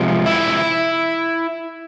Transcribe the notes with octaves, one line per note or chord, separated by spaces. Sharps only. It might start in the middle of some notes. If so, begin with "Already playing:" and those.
Already playing: C3 F3 G#3
E4